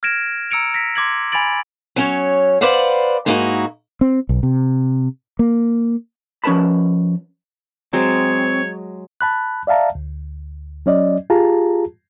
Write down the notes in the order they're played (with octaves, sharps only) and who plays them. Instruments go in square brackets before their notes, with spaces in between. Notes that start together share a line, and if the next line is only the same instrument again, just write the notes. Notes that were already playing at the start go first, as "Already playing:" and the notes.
[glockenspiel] F6 G#6 A#6 D7 E7
A#5 E6 C#7 D7 F7
A#6 B6
C6 D6 G#6 F#7
G#5 B5 G#6 A6 D7 F#7
[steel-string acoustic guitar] F#3 C#4 C#5
B4 C5 D5 F5 F#5
G#2 A#3 B3 D#4 E4 F#4
[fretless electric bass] C4
B1
C3
A#3
[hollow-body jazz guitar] F3 C#4 A#4 B4 A5 B5
[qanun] F#3 G#3 [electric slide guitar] C4 [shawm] C#5
[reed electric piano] A5 B5 F#6
D5 E5 F5 A5 A#5
D2
F#3 C#4 D5 D#5
F4 G4 G#4 A5 A#5